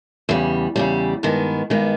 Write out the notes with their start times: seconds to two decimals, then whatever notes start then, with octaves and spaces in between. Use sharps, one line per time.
0.29 E2 C#3 G3
0.76 E2 C#3 G3
1.23 G2 D#3 G#3 B3
1.70 G2 D#3 G#3 B3